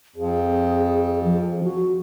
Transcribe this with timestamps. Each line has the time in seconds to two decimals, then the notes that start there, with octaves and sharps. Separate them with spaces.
0.16 F2 G#4
1.24 F3
1.64 F#4